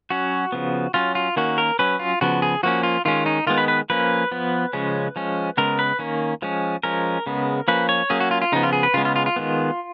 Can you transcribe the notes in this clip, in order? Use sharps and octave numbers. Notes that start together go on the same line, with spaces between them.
F#3 C#4 F#4
C#3 F3 B3
F#3 C#4 F4
F4
D#3 A#3 C#4 F#4
A#4
F#3 C#4 B4
F4
C#3 F3 B3 F#4
G#4
F3 A#3 C#4 F#4
F4
D#3 G#3 C#4 F4
D#4
D#3 G#3 B3 F4
B4
B4
F3 A#3 C#4 B4
F3 B3
C#3 F3 G#3 C#4
F3 G#3 C#4
C#3 G#3 B3 A#4
B4
D#3 A#3 C#4
F3 G#3 C#4
F3 G#3 C#4 A#4
C#3 G#3 B3
F3 A#3 C#4 B4
C#5
F#3 A#3 C#4 G#4
F#4
F4
F4
C#3 F3 B3 D#4
F4
G#4
B4
C#3 G#3 B3 F4
F4
F4
F4
D#3 G#3 B3